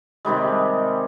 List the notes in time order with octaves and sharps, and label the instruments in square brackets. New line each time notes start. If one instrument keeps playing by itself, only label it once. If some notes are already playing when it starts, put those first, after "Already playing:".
[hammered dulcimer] C3 D#3 G3 G#3